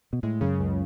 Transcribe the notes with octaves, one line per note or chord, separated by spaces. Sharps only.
B2
A2 G#3
F#2 C#3
C#2